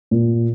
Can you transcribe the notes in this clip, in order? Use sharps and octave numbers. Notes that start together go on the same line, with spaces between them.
A#2